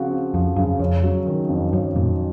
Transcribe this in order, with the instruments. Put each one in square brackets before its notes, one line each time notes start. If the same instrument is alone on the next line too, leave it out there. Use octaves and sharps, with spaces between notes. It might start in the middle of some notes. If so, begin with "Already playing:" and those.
Already playing: [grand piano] C#3 F3 C4 F#4
C4
[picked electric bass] F2 [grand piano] F3
[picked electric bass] F#2 [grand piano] C#3
[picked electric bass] F2 [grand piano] C#4
[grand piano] F#3
D#3
F2
[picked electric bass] F#2 [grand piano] C#4
[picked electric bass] F#2 A#2 [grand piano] F#3